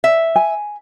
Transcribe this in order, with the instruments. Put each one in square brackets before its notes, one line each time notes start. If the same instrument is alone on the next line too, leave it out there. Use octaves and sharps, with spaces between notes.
[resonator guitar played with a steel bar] E5
[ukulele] G#5